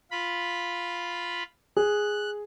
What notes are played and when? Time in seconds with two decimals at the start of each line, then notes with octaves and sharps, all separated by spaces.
0.11 F4 B5
1.77 G#4 F#6